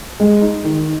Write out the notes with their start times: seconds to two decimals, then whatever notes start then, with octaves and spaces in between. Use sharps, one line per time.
0.20 G#3
0.42 D#4
0.64 D#3